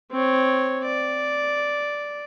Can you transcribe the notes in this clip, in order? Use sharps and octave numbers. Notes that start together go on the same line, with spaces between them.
C4 C#5
D5